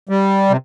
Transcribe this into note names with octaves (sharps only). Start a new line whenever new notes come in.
G3
C3